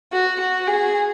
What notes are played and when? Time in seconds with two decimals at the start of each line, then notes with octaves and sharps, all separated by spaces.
0.12 F#4
0.39 F#4
0.68 G#4